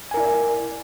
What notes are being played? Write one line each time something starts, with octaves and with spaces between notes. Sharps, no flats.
E4 A#4 D5 G#5